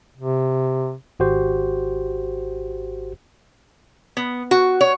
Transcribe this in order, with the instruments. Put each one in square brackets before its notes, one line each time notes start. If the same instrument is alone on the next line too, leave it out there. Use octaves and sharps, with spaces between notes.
[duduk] C3
[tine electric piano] G#1 F#4 G4 C5
[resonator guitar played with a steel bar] B3
F#4
C#5